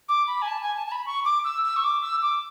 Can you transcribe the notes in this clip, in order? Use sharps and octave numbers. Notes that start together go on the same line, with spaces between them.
D6
B5
G#5
A5
G#5
A5
A5
B5
C#6
D6
E6
E6
C#6
D6
E6
D6